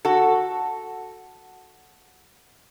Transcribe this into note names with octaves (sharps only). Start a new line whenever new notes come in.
F#4 A4